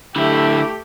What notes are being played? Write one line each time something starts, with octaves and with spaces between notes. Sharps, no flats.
D3 A3 E4 G4